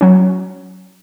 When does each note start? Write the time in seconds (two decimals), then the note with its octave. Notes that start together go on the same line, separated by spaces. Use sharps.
0.01 F#3 C#4